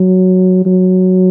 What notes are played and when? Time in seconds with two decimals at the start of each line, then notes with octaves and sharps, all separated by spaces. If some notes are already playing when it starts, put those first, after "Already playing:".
Already playing: F#3
0.65 F#3